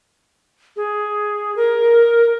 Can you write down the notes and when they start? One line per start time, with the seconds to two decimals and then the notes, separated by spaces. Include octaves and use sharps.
0.77 G#4
1.56 A#4